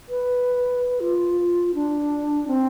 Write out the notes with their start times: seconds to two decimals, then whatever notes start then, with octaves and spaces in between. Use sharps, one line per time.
0.09 B4
1.00 F4
1.75 D4
2.48 C4